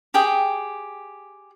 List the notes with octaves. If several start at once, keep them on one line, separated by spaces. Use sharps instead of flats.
G4 G#4 G5 D#6